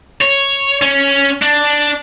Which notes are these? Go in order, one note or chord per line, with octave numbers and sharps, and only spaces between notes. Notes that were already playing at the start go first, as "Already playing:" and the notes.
C#5
C#4
D4